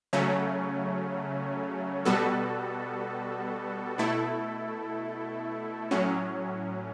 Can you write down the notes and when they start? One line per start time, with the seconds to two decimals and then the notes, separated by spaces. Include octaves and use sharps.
0.13 C#3 F#3 A3 C#4
2.05 B2 G3 B3 F#4 A4
3.98 B2 A3 E4 A4
5.91 A2 F#3 C#4